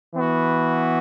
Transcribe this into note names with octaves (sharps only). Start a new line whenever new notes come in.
E3 B3 F#4